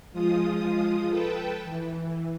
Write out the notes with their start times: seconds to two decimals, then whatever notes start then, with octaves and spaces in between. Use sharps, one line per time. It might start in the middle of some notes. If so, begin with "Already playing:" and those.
0.12 F3 G#3 F4 D#6
1.09 A4 B4 G5 A5
1.64 E3